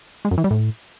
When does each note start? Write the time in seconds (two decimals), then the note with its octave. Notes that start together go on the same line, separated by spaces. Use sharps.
0.25 G#3
0.31 F#2
0.38 E3
0.44 G3
0.51 A2